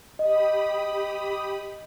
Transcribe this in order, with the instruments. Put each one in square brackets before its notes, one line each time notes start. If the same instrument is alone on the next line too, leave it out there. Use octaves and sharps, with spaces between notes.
[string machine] G4 B5 D#6 [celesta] D#5